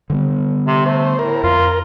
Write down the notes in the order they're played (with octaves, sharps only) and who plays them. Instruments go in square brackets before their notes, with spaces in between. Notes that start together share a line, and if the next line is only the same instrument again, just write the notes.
[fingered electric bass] D3 G3 B3
[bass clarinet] C3
[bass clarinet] A3 [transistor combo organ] C5
[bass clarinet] A2 [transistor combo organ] A#4
[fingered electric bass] F2 [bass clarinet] F4